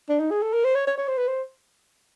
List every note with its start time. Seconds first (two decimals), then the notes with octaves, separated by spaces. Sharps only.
0.09 D4
0.20 D#4
0.31 G#4
0.42 A4
0.53 A#4
0.65 C5
0.75 C#5
0.87 C#5
0.97 C#5
1.08 C5
1.18 B4
1.28 C5